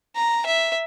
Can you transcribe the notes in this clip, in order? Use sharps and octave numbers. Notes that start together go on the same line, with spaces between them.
A#5
E5